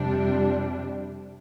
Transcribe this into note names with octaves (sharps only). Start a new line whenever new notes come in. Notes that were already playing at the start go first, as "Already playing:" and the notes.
Already playing: F2 C3 G3 D4